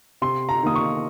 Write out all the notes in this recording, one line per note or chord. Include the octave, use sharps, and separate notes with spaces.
C3 C6
A#5
D#3 A#3 D#6
C#6